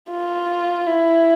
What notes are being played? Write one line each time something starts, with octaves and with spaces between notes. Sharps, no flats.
F4
E4